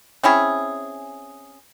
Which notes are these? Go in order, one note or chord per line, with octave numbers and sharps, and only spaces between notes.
C4 C#4 E4 G#4